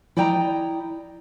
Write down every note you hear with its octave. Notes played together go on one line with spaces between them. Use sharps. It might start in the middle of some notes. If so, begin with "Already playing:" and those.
E4 D5 D#5 G5 A5 A#5